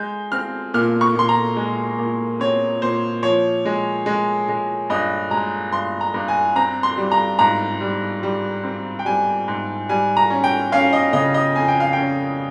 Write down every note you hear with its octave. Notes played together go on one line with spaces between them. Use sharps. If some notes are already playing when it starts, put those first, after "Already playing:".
Already playing: G#3 G6
C4 F6
A#2 F6
C#6
A#2 C6
A#5
G#3
A#2
C4 C#5
A#2 C5
F3 C#5
G#3
G#3
G#3
G2 D#5
G#3 A#5
G2 C6
A#5
G2
G#5
C4 A#5
C6
G3
A#5
G#2 A#5
G3
G3
C4
G5
G3 G#5
G#2
G3 G#5
A#5
C#4
G5
C#4 F5
D#5
C#3 D#5
D#5
F2 G#5
G5
F5
C#4 G5